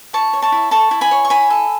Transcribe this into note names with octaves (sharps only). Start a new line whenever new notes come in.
E4 A5 C#6
C#5
A5 C#6
E4
A4 A5 C#6
E4
G#5 B5
C#5
C#6
E4 G#5 B5
A4